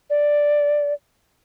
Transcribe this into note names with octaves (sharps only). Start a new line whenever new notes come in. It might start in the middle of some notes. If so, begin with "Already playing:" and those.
D5